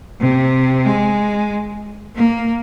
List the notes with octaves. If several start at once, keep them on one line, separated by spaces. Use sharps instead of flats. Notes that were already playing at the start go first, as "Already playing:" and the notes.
C3
G#3
A#3